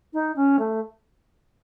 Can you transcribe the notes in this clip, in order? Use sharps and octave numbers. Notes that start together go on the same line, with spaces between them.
D#4
C#4
A3